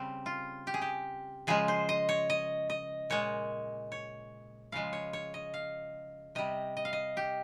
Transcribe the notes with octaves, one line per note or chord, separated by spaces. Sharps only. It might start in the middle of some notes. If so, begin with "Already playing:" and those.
Already playing: C#3 G3 C4
F4
G4
G#4
G4
C#3 F3 G#3 G#4
C5
D#5
C#5
D#5
D#5
A#2 G#3 C#5
C#5
C#3 F3 G#3 F5
C#5
C#5
D#5
F5
C3 G3 D#5
D#5
F5
D#5
G4